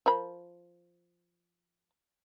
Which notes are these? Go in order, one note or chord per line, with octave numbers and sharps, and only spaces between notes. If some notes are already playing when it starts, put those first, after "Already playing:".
F3 A#4 B5